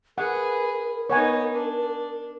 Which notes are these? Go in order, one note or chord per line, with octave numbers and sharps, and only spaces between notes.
G#4 A#4 B4 F#5
B3 D#4 C#5 F#5 G#5
D4